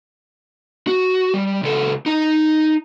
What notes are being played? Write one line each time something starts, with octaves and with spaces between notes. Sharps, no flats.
F#4
G3
C#2 A4
D#4 A#5